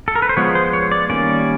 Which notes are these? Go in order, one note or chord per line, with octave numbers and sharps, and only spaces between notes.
A4
A#4
B4
C5
F3 G#3 B3 C#5
C5
C#5
D5
D#3 G3 A#3 C#4 D5